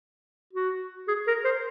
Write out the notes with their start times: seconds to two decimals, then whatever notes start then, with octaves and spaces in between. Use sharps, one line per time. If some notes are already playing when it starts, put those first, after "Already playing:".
0.53 F#4
1.08 G#4
1.27 A#4
1.45 C5